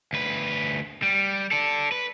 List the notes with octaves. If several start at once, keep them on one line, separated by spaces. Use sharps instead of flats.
D2 B4
G3
A4 D5
B4